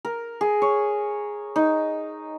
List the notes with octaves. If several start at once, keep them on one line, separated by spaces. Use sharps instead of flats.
A#4
G#4
C#5
D#4